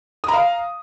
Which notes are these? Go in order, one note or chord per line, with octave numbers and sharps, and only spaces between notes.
F5 A#5 D#6